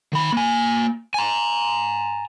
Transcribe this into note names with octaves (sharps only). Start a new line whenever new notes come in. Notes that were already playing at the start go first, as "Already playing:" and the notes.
D#3 B5
A#3 G#5
G#5 A#5